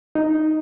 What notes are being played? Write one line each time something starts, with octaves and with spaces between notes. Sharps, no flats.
D#4